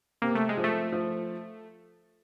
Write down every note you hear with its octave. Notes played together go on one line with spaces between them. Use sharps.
C3 A#3
A3
G#3
F3
A3
F3